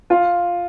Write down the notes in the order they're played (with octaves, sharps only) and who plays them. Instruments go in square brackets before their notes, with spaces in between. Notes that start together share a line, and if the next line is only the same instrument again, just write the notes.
[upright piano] F4